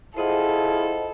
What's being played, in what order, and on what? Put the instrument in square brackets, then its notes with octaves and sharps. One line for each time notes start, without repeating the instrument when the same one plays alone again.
[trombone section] E4 F4 G#4 [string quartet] A4 [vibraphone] C5 D#5 F#5